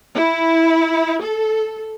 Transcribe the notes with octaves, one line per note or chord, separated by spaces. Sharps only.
E4
A4